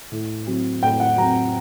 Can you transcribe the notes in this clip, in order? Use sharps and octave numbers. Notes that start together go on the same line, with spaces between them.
A2
F#3 C4
A2 G5
F#5
F#3 C4 A#5